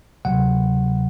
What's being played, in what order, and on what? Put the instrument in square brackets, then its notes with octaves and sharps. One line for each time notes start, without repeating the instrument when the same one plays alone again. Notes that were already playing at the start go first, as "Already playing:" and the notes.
[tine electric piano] D2 C3 F#3 F#5